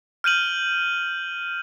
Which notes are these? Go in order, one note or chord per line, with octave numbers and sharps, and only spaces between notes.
F6 G6 D#7 F#7